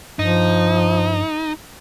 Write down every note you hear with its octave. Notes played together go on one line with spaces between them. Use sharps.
G2 F3 D#4